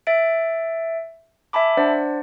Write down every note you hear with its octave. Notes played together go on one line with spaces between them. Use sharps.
E5 A6 D7
E5 G#5 A5 B5 D6
D4 C5 D5 F#5